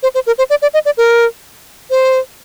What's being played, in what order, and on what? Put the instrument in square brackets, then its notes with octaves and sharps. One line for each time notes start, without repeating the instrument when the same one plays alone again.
[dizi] C5
C5
A#4
C5
D5
D5
D#5
D5
A#4
C5